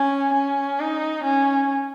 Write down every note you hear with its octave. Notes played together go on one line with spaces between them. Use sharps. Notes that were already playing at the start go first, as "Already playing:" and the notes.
Already playing: C#4
C#4
D#4
C#4